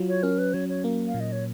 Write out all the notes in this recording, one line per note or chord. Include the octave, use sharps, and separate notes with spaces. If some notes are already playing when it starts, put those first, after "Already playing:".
Already playing: F#3 F4
C#5
C#4 A#4
B4
F#3 C#5
C#5
A#3
F5
A#2
D#5
C#5